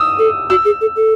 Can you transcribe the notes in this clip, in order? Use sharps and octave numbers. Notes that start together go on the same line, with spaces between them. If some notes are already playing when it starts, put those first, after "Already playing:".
Already playing: D#6 E6
A4
F#4 E6
G#4
A4
A4